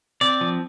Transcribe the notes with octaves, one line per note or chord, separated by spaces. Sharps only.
C4 D5
F3